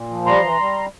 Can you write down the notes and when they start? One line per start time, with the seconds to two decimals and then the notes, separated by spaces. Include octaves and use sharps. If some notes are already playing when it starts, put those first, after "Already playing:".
Already playing: A#2
0.10 F3
0.26 G3 A#5 C6
0.43 E3
0.59 G3